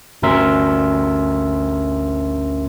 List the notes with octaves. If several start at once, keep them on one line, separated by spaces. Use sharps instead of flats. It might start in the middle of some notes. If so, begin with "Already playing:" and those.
G1 D2 C#4 A#4 E5 C6